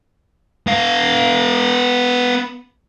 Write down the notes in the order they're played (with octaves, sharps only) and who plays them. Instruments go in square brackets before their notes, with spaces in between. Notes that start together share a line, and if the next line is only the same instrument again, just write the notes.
[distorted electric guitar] B3 F5